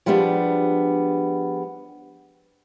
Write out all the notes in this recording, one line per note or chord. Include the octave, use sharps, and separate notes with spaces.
F3 G3 G#3 B3 D4